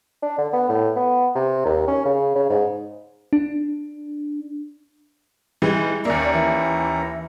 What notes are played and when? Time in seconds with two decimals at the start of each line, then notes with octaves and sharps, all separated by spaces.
0.22 D4
0.38 D3
0.53 B3
0.69 A2
0.96 B3
1.35 C3
1.65 D#2
1.88 C#4
2.05 C#3
2.36 C#3
2.50 G#2
3.33 D4
5.62 E3 G3 G#3
6.05 D#2 A#3 C#4 D5 E5 A#5
6.34 E3